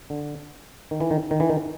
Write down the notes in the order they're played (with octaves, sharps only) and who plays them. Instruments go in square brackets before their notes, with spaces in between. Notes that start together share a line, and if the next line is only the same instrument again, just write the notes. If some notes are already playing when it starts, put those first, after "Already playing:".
[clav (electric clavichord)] D3
D#3
E3
D#3
D#3
E3
D#3